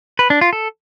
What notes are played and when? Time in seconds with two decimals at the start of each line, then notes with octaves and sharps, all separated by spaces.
0.19 B4
0.30 D4
0.41 F4
0.53 A4